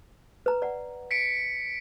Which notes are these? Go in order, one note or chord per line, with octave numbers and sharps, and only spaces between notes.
B4 A#5
D5 F#5
B6 C#7 D7